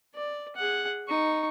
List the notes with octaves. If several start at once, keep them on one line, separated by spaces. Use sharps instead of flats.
D5
G#4 F#5
D#4 C#6